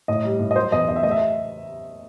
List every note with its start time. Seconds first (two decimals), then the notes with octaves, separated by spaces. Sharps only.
0.08 A2 D#5
0.25 G3
0.40 A2
0.51 D#5
0.56 F#3 C5
0.72 E2 D#5
0.88 E2 D#5
0.96 E5
1.03 A3 D#5
1.11 E5